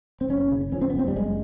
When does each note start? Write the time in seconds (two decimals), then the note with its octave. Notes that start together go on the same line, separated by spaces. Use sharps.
0.21 C4
0.29 F#1 C#4
0.52 C#3
0.72 F2 C#4
0.81 C4
0.90 B3
0.94 F#1
0.99 C4
1.08 G3
1.16 F#1 G#3